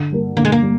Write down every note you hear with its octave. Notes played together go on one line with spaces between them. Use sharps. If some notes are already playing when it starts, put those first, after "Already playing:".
Already playing: D3
G3 A#3
D3 A#3
G#3
A#3
G3